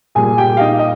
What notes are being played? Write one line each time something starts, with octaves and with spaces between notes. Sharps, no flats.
A#2 G3 G#4 G#5
G4 G5
F5
D#4 D#5
D#5